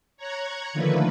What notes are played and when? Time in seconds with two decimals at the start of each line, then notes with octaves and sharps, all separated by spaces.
0.17 C#5 A#5 C#6 F#6 G#6
0.73 D3 D#3 F3 A3 A#3 B4